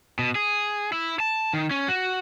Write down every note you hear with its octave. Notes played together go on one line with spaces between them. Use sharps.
B2
G#4
E4
A5
D#3
C#4
F#4